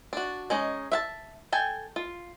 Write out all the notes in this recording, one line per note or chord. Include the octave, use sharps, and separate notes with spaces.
D4 F#4
G#3 C#4 D#4
E5 F5 A5
A4 G5 G#5
F4